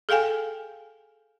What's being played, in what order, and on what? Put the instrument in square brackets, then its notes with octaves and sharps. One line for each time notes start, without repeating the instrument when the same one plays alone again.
[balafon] G#4 A4 F5 G5 G#5